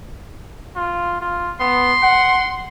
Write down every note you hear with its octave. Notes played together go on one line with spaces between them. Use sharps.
F4
F4
B3 C6
F#5